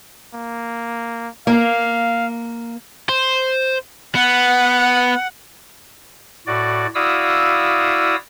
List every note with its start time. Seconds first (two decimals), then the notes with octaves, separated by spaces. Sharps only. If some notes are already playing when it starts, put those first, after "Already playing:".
0.34 A#3
1.47 A#3 F5
3.09 C5
4.15 B3 F#5
6.47 A2 F#4 D5
6.95 E4 F#4 D5 F5 D#6 E6